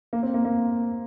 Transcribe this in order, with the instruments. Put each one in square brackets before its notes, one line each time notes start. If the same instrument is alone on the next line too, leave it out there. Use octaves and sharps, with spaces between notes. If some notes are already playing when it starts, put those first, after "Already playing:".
[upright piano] A#3
C4
A#3
A#3